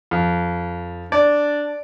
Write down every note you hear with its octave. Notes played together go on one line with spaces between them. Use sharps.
F2
D4 D5